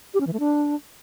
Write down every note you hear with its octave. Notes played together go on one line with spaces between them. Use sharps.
G4
C#4
E3
A3
D4